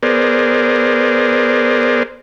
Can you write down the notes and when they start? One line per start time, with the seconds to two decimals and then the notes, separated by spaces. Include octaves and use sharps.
0.03 B3 G#4 A#4 C5 D5